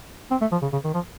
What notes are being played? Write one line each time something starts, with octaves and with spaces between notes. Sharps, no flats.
C4
A3
F3
C#3
C#3
D#3
F3